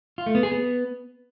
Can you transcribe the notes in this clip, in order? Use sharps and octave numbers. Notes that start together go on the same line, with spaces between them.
F4
A3
B3
G#4
B3